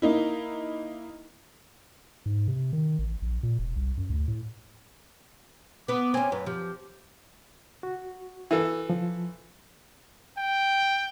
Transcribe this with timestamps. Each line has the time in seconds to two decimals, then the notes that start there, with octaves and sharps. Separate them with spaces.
0.02 A#3 D#4 E4
2.26 G#2
2.48 C3
2.73 D#3
2.99 A1
3.22 A#1
3.43 A#2
3.59 E1
3.76 C2
3.97 F#2
4.10 D2
4.28 A2
5.88 B3 B4 D6
6.14 C4 C#4 G#5
6.32 F#2 B4
6.46 F3 G4
7.83 F#4
8.51 E3 A4
8.90 F3
10.38 G5